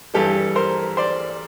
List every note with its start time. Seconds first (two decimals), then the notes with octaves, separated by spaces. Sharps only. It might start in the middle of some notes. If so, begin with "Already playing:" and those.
0.14 G2 E3 G3 G4 A4
0.55 A#4 C5
0.97 C5 D5